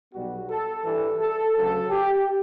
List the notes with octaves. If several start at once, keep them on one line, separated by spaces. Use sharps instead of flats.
B1 B2 G3 B3 F#4
A4
G2 E3 G3 A4
A4
D2 C#3 F#3 A4
G4